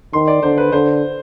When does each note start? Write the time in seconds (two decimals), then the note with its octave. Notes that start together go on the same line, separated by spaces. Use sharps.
0.13 D#3 C6
0.28 D5
0.43 D3 C5
0.58 B4
0.72 D3 C5